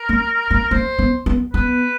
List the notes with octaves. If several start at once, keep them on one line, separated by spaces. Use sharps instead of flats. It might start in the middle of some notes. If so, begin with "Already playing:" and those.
Already playing: A#4
A#3
A#3
A#3 C5
B3
B3
B3 B4